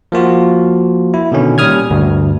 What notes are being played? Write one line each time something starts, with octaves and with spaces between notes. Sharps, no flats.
F3 A#3 F4 F#4
E4
B2 D3 D#3 C#4
A#2 G3 C#4 D#6 F6 G#6
D2 G2